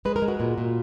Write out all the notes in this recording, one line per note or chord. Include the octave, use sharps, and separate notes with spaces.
G#3 B4
A#4
G#3
F#4
A#2
A#2